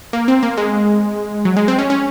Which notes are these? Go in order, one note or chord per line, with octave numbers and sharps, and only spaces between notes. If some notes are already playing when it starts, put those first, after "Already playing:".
A#3
C4
A#3
G#3
F#3
G#3
C4
C#4
C#4